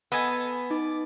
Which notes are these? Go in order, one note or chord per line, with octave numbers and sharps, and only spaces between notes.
B3 A4 D#5 G#5
D#4 D5